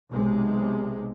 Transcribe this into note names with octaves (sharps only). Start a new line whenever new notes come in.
B1 C3 G#3